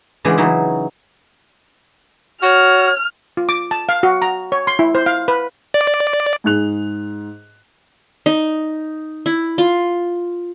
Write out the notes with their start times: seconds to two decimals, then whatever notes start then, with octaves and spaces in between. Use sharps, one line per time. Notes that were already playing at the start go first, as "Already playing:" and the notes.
0.25 C#3 E3 G#3 B3 D4 G#4
0.37 C#3 E3 F#3 D#4
2.43 F#4 C#5 F6
3.37 F4
3.49 D6
3.71 A5
3.89 F5
4.03 F#4
4.22 A#5
4.52 C#5
4.67 C6
4.79 E4
4.95 C5
5.06 F5
5.28 B4
5.74 D5
6.44 G#2 G#4 F#6 F7
8.26 D#4
9.26 E4
9.58 F4